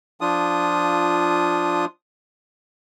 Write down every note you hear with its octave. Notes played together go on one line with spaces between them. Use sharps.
F3 D4 F4 D#6